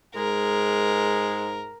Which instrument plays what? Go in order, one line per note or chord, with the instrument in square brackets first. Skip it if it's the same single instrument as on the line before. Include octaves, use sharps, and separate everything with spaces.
[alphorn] G#2 [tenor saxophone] G#3 [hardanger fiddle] A#4